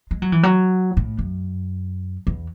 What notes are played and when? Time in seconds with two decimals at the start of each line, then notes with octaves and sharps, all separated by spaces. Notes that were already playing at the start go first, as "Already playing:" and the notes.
0.11 G#3
0.22 F#3
0.32 E3
0.43 F#3
0.97 A2
1.18 F#2
2.27 E2